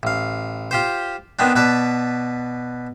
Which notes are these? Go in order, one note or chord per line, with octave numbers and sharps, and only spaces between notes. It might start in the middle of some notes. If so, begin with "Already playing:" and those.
A1 F5
F4 G4 C5
D#3 B3 C4 D4
B2 B4 D5 A5